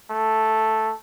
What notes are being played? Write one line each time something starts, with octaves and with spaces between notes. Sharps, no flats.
A3